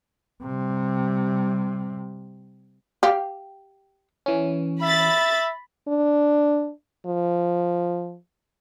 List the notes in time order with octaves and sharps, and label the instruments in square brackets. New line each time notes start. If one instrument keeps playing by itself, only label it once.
[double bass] C3 G3
[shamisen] G4 F5
[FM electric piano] E3 C#4
[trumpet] E5 [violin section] B5 A6
[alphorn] D4
F3